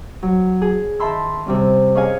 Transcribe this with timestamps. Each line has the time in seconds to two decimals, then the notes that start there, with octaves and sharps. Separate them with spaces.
0.23 F#3
0.62 G#4
1.00 D#3 E5 A5 B5 C6 E6
1.46 C3 G3 C#4
1.95 C#4 G#4 C#5 D#5 F5 G#5